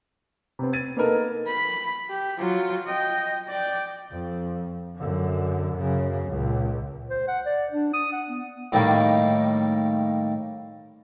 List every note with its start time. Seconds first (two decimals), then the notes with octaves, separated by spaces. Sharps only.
0.59 C3 B3 C4
0.73 G#6 A6 D#7
0.97 A#3 B3 D#4 A4 A#4
1.46 B5
2.09 G4
2.38 F#3 F4
2.86 D#5 G5
3.48 D5 G5
4.12 F2
4.96 F#2 D3
5.74 F#2 C#3
6.29 C#2 A#2
7.10 C5
7.28 F#5
7.46 D5
7.72 D4
7.94 D#6
8.12 F#5
8.28 B3
8.72 A2 D#3 G3 A#3